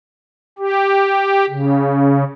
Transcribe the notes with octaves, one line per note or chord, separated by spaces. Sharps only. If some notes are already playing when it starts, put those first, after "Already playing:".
G4
C#3